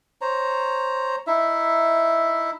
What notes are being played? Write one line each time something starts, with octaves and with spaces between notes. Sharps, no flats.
C5 C#5 A#5
D#4 E4 E5